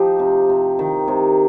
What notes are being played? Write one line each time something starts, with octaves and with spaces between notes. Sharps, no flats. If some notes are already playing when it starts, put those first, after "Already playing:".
Already playing: F3 D#4 G4
C3
C3
D#3
C3